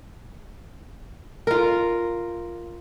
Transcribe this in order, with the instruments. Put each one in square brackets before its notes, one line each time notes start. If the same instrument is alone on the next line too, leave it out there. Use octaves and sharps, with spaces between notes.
[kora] F4 A#4